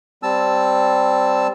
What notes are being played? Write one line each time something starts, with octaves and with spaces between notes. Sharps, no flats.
G3 C4 A5 E6